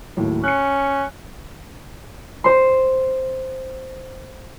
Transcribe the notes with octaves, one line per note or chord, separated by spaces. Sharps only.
D#2 A2 F#3
C#4 F#6 C#7
C5 C6